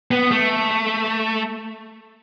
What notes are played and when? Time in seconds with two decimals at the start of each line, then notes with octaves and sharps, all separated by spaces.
0.11 B3
0.31 A3